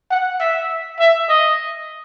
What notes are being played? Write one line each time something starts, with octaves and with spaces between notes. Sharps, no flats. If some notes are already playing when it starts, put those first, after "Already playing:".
F#5
E5
E5
D#5